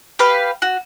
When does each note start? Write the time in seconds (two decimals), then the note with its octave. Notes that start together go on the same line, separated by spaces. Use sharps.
0.19 G4 B4 F5
0.62 F#4